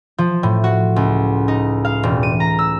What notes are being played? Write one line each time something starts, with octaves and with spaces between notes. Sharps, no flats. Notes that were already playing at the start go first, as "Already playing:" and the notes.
F3
A2
F#4
C#2
D#4
F5
E1
D#7
A#5
E6